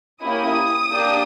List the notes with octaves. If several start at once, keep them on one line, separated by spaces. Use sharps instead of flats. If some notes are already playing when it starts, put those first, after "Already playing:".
A#3 C#4 E4 G4 D#6
A#3 D4 G4